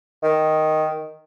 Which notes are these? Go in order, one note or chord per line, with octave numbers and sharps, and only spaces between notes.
D#3